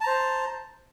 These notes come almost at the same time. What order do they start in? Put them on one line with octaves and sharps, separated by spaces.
A5 A#5 C5